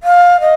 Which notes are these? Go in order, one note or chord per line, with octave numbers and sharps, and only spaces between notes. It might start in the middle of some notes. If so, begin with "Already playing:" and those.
F5
D#5